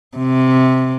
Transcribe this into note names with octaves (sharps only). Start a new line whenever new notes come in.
C3